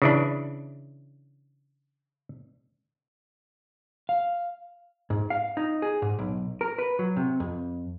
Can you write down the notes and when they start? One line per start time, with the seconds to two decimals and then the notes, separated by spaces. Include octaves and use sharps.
0.02 C#3 E3 D4
4.09 F5
5.10 G#2
5.30 F5
5.57 D#4
5.82 G#4
6.02 G#2
6.19 B1
6.61 A#4
6.78 B4
6.99 F#3
7.17 C3
7.40 F2